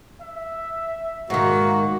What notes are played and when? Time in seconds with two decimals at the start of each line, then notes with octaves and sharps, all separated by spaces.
0.22 E5
1.30 G#2 D#3 A#3 F#4